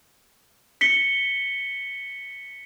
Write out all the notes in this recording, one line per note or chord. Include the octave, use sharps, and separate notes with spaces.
B6 C#7 G7